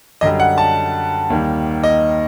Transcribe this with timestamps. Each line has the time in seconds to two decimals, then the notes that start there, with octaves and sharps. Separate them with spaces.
0.21 F#2 D3 G3 D#5
0.40 F#5
0.58 A5
1.30 D#2 D#3 G3
1.84 D#5